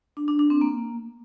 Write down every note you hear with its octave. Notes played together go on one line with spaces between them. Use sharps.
D4
D4
D4
C4
A#3